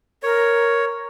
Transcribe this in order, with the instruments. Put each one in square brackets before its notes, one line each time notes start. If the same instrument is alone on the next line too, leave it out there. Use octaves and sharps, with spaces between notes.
[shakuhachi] A#4 [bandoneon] C#5